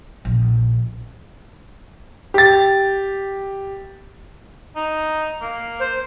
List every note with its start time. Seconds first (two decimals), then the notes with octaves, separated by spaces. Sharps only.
0.25 A#1
2.34 G4 A6
4.76 D#4
5.41 A#3
5.80 C5